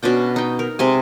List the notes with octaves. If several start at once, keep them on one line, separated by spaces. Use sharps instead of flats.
B2 C#4 D4 G5
D#4 G5
A#4
C3 G#3 G#5